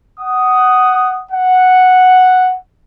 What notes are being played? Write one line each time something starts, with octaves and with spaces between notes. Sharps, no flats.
F#5 D#6
F#5